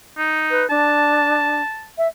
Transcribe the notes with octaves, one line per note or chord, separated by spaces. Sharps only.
D#4
B4
D4 A5
E5